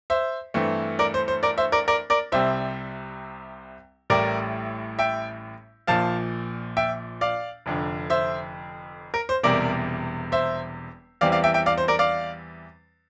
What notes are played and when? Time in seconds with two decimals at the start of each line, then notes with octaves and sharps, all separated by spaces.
0.10 C5 E5
0.54 G2 E3 A3 C4
0.99 A#4 D5
1.14 C5
1.28 C5
1.43 A#4 D5
1.58 C5 E5
1.72 A#4 D5
1.88 A#4 D5
2.10 A#4 D5
2.32 C2 C3 G3 C4 C5 E5
4.10 A1 A2 G3 A#4 D5
4.99 E5 G5
5.87 A#1 A#2 F3 F5 A5
6.77 E5 G5
7.21 D5 F5
7.66 F1 F2 D3
8.10 C5 E5
9.14 A#4
9.29 C5
9.43 E1 E2 C3 G3 A#4 D5
10.32 C5 E5
11.21 E2 E3 G3 C4 D5 F5
11.32 D5 F5
11.44 E5 G5
11.54 E5 G5
11.66 D5 F5
11.78 C5
11.88 A#4 D5
11.99 D5 F5